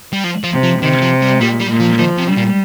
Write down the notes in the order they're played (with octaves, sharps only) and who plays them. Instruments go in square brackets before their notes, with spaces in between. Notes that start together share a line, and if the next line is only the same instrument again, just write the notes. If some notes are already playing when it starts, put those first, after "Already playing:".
[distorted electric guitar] G3
F3
F3
[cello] C3
[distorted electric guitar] F3
[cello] C3 [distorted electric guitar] D#3
[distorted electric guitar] F3
G3
[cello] A#2 [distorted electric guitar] G3
[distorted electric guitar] G3
[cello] A#2
[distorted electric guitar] F3
[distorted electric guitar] D#3 [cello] F3
[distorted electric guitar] C3
[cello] G3
[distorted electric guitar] A#2